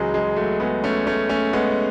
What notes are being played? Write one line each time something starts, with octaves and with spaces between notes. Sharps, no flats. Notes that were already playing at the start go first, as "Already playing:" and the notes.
Already playing: C#2 C#3 E3 F#3 G#3
G#3
F#3 A3
G#3 B3
A3 C#4
A3 C#4
A3 C#4
G#3 B3